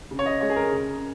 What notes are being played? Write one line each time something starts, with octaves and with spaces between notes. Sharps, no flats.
C#3
C#5
D#5
G#3 C#5
G#4
A#4
C#3